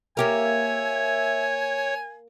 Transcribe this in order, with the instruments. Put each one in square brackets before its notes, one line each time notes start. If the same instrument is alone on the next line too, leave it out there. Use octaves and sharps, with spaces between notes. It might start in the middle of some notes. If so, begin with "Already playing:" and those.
[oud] A#3 G4 A#4 [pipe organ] C#5 [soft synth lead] E5 [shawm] G#5